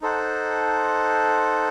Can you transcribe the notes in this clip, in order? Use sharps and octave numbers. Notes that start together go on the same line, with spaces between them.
D#4 A4 C5 F#5